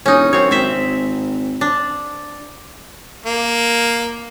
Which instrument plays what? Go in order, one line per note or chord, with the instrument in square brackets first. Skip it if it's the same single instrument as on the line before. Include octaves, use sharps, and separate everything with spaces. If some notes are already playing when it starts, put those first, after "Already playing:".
[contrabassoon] E1 [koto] C#4 D#4
[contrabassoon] F#2 [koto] C4 C#5
[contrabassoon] G#1 [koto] C4 E5
[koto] D4
[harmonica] A#3